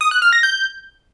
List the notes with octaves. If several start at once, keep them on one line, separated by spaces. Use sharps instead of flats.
D#6
F#6
F6
A#6
G6